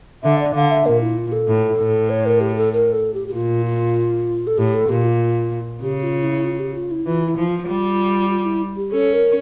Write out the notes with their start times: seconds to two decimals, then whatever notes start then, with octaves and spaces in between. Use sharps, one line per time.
0.23 D3 E5
0.39 D5
0.54 D3 F5
0.71 E5
0.86 A#2 A#4
1.01 E4
1.17 F4
1.32 A4
1.47 A2
1.78 A2
2.09 C#5
2.26 A#4
2.40 G4
2.56 A4
2.72 A#4
2.92 A4
3.14 G4
3.28 G4
3.33 A#2 F4
3.65 F4
4.47 A4
4.58 A2 G4
4.74 A4
4.89 A#2 G4
5.05 F4
5.82 C#3 G4
6.03 F4
6.23 E4
6.44 F4
6.59 G4
6.75 F4
6.91 E4
7.06 E3 F4
7.26 E4
7.37 F3
7.48 F4
7.67 G3
8.30 F4
8.45 E4
8.76 G4
8.92 C#4 A4
9.13 A#4